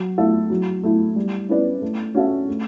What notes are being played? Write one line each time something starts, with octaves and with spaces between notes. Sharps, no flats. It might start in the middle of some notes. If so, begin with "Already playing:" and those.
Already playing: F#3
A3 E4 A4 E5
F#3
A3 E4
G3
C#4 E4 B4 D5
A3
C#4 F#4 A4 E5
A3